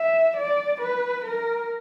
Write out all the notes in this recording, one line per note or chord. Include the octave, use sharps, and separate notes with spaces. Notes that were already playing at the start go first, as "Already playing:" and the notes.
Already playing: E5
D5
B4
A#4